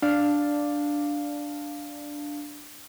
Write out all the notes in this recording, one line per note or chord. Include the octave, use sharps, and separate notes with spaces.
D4 F5